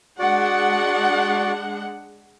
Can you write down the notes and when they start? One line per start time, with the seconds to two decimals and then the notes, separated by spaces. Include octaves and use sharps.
0.19 G#3 D4 F#4 D5 F#5